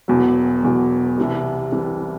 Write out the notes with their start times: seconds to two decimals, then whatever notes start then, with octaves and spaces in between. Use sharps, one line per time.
0.08 E1 E2 B2 F#3
0.63 E1 E2 B2 F#3
1.18 C2 C3 E3 G3
1.72 C2 C3 E3 G3